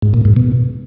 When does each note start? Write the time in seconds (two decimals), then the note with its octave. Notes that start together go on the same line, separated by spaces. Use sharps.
0.02 G#2
0.14 A#2
0.25 G#2
0.36 B2